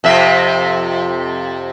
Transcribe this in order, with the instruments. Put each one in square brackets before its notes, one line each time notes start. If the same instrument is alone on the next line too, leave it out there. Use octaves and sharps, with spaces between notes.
[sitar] F2 C3 E5